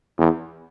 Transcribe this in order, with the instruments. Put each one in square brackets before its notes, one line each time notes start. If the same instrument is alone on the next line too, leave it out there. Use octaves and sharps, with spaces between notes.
[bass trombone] E2